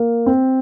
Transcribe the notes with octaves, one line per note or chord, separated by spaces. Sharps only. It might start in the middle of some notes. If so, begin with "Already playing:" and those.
Already playing: A#3
C4